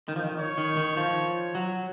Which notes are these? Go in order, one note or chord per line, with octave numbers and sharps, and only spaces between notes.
D#3
F3
D#3
C#5
D#3
D#3
F3
F#3